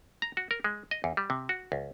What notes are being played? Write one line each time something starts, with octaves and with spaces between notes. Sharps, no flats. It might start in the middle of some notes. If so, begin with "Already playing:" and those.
A#5
F#4
A#4
G#3
D#5
E2
G3
C3
F#4
C#2